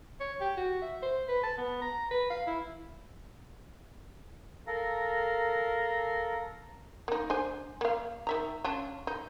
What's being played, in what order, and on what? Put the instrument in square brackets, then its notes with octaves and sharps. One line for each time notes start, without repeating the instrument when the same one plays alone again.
[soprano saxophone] C#5
G4
F#4
E5
C5
B4
A5
B3
A#5
B4
F5
E4
[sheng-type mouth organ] A4 A#4 F5 A#5
[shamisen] A#3 D#4
D4 C5 G#5
A#3 F5
D#3 E5 A#5
C#4 D4 F4
D#4